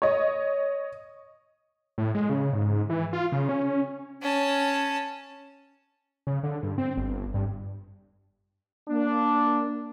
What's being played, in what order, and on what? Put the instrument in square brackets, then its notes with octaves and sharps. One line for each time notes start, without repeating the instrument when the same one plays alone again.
[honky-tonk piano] C#5 D#5
[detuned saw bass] A2
G#3
C#3
G#2
E3
F4
C#3
C#4
[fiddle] C#4 A5
[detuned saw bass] C#3
D3
G2
C4
G1
G2
[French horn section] A#3 [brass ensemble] D4